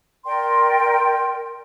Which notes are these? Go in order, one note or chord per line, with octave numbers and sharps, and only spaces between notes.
A#4 D5 G5 C6